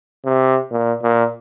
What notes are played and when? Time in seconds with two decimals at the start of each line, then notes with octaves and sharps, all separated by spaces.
0.25 C3
0.71 A#2
1.03 A#2